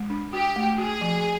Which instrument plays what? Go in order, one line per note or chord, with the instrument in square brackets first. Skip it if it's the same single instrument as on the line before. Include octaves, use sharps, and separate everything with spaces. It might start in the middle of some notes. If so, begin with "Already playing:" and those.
Already playing: [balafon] G#3
D4
[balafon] F#4 [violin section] G4
[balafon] A3
[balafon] F#4 [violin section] G#4
[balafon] F3